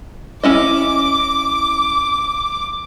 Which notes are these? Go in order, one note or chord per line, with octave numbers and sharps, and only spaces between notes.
C#4 E4 D#5 D6